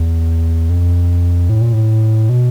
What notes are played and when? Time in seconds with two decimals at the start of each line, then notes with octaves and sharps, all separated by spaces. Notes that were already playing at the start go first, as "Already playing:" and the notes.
Already playing: E2
0.70 F2
1.49 A2
1.61 A#2
1.73 A2
2.29 B2